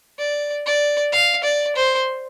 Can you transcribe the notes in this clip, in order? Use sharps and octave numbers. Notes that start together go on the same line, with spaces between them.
D5
D5
F5
D5
C5